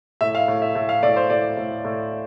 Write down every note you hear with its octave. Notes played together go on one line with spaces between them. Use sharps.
A2 E5
F5
A2
E5
A2
F5
A2 D5
C5
A2 D5
A2
A2